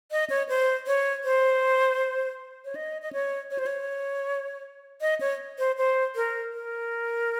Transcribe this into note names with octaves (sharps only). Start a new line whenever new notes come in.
D#5
C#5
C5
C#5
C5
C#5
D#5
D#5
C#5
C#5
C5
C#5
D#5
C#5
C5
C5
A#4
A#4